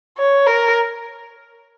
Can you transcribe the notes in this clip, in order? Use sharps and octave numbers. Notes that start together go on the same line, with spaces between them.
C#5
A#4